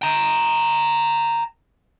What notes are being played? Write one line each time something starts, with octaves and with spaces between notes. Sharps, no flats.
G5 A#5